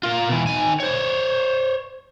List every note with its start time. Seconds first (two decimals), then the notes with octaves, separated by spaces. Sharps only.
0.03 F4 A#4
0.29 B2 E3
0.47 D#3 G#5
0.80 C5 C#5